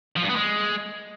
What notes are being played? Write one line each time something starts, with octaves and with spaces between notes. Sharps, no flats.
F3
G2
B3
G#3